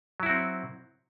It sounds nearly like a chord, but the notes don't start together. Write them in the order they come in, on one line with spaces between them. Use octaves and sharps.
F#3 E4 F#4 C4